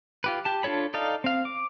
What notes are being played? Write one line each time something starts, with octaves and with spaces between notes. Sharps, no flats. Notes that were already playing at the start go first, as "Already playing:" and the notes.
F4 G4 B4
G4 A5
D4 F4 A4 C#5 B5
D#4 A4 D5 F5
C4 F5
D6